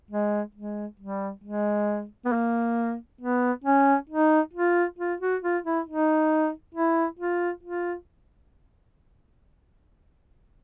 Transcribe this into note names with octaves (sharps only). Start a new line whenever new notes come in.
G#3
G#3
G3
G#3
B3
A#3
B3
C#4
D#4
F4
F4
F#4
F4
E4
D#4
E4
F4
F4